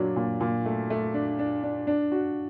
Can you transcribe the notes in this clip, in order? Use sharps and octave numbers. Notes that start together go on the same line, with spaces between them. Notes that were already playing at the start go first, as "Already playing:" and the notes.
Already playing: A#2 F#3 D4
A#2
A#2
A3
A3
D4
D4
D4
D4
F#4